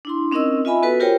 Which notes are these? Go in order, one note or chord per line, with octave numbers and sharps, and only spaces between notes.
D4 E4 C6
C4 C#4 D#4 A#4 D#5 E6
F4 D#5 E5 G#5 B5
B3 F#4 A4 B4
F4 G4 A#4 C5 C#5 G5